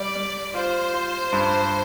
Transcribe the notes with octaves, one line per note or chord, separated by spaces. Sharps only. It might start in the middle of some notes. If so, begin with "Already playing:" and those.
Already playing: G3 D5
G3
F4 C5
F4
G2